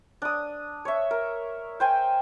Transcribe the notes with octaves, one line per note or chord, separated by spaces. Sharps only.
D4 D#6
C#5 E5
A#4
C5 G5 G#5